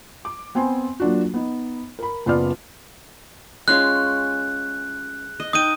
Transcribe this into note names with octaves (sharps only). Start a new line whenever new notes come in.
D6
B3 C4 C5 G#5 C6
F#3 A#3 D4 F4 F#4
B3 D#4
A#4 B5
F#1 B3 F4 B4 D5 F6
G#3 C#4 F4 F#6
D#5
D#4 G5 D#6 D#7